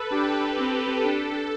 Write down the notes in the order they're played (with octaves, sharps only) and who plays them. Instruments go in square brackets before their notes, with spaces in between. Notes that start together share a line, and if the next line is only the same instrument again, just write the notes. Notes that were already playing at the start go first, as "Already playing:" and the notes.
Already playing: [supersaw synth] A4 B4
[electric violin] D4 [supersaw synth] G4
[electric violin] C4
[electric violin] D4 [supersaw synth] A4